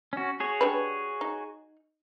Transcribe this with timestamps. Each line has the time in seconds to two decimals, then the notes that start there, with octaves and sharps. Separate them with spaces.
0.13 C#4 F#4
0.40 F#4 G#4 C#5
0.61 G3 D4 B4
1.21 D#4